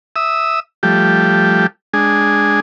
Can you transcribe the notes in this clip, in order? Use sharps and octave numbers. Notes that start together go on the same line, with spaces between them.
E5 D#6 E6
F3 G3 A3 G4
G#3 D4 G#4